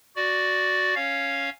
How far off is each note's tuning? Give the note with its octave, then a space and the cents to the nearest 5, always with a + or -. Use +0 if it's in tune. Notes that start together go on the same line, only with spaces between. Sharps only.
F#4 +0 D5 +0
C#4 +0 C#5 +0 F5 +0